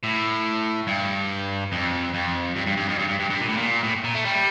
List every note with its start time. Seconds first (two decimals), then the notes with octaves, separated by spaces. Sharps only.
0.03 A2
0.87 G2
1.72 F2
2.14 F2
2.56 G2
2.67 G2
2.77 G2
2.88 F2
2.99 G2
3.09 G2
3.20 G2
3.30 G2
3.41 A#2
3.49 A2
3.57 A#2
3.83 A2
4.04 A#2
4.15 A3
4.25 G3